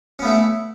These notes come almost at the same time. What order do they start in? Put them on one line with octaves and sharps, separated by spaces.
C#4 B3 A3 E4